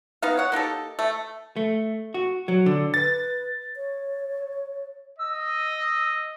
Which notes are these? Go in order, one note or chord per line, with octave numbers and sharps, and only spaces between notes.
B3 D#4 F5
C#5 F#5
A#3 D#4 G4 A4
A3
A3
F#4
F#3
D3
B4 A6
C#5
D#5 E6